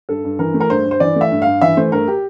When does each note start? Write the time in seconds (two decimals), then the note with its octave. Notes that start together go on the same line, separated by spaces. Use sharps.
0.09 G2 A4
0.24 G2
0.39 E3 A#4
0.54 A3
0.60 A#4
0.70 G2 C5
0.85 G2
0.91 C5
1.00 E3 D5
1.16 A3 E5
1.31 G2
1.42 G2 F5
1.62 E3 E5
1.77 A3 C5
1.92 G2 A#4
2.08 G4